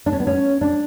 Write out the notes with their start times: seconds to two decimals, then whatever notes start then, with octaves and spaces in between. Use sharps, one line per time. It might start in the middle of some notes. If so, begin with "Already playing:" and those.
0.06 D4
0.13 C#4
0.20 B3
0.27 C#4
0.61 D4